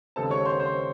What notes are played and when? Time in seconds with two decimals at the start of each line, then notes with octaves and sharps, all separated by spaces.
0.16 D#2 C#3 G#3 C4 D#4 A4 A5
0.31 C#5 C#6
0.46 C5 C6
0.60 C5 C6